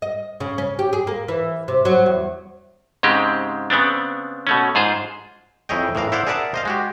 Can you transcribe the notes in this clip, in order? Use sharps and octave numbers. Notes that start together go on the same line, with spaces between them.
D#5
C#3
C#4
G4
G#4
A#3
E3
C3
F#3
E2
G#2 C#3 G#3 C4 G4
C#3 B3 C4 D4
B2 A3 C#4
G#2 F4 G#4 C5
F2 E4 G#4 C#5 D#5 G5
A2 E3 A#4 F5
E4 C5 D5 F5 F#5
G#4 A#4 D5 E5 F#5 A5
C5 D#5 F5
G#3 F#4 G4